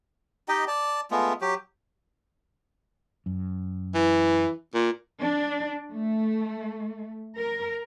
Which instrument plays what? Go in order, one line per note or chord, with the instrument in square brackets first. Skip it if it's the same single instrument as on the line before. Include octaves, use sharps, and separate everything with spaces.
[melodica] D#4 G4 D#5 G5
D5 A5
G#3 A3 B3 F4
F#3 G4
[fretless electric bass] F#2
[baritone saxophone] E3
A#2
[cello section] D4
A3
A#4